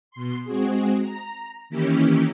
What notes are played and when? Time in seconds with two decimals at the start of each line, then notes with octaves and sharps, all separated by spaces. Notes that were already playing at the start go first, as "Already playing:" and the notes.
0.11 B2 C6
0.45 G#3 C4 F#4 G#4
1.02 A#5
1.70 D#3 E3 A#3 C#4 E4 G4